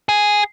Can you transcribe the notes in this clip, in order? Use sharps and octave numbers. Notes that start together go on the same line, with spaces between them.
G#4